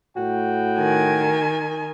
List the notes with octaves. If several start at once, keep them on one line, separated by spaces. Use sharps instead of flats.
A2 F#4 G5
D#3 G#5